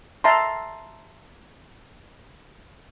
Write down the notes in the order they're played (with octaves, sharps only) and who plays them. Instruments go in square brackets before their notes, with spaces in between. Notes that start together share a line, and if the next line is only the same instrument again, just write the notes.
[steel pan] E5 A5 A#5 C6